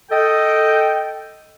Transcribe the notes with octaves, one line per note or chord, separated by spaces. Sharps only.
A4 D#5 G5